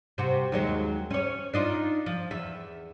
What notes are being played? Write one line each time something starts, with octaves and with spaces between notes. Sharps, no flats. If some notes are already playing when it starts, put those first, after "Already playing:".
C3 F#4
D#2 F#3 G#3
C#4 C#5
D4 D#4 F4
F3
E2 E5